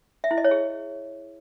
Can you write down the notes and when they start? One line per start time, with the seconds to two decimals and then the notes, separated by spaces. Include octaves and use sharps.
0.24 E5
0.31 E4
0.38 D#5
0.44 C#5
0.51 G#4